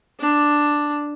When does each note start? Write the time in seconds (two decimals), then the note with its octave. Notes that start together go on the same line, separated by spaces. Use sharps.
0.20 D4